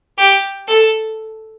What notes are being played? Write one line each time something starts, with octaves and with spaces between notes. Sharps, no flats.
G4
A4